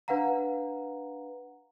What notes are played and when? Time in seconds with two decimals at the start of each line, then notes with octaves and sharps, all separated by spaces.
0.08 D4 B4 F5 F#5 A#5